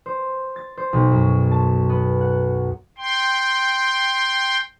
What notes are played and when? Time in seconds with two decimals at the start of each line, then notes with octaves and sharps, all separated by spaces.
0.06 C5
0.56 A6
0.77 C5
0.93 B1
1.11 F#2
1.51 A5
1.89 B3
2.21 F#5
2.98 G5 C6